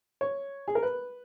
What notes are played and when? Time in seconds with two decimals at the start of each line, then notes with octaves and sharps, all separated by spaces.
0.21 C#5
0.68 G#4
0.75 A#4
0.83 B4